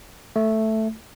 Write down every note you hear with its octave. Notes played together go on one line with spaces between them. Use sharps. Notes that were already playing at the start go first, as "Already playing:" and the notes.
A3